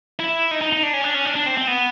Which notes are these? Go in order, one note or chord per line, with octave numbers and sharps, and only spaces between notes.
E4
D#4
D#4
D#4
D4
C#4
D4
C#4
D4
D4
C4
C4
B3